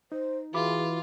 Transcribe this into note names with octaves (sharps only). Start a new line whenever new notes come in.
D#4 C5
E3 F4 F#4 G#4 B5 D6